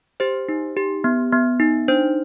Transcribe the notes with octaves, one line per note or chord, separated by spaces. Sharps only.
G4 C5
D#4
G4
B3
B3
D#4
D4 C5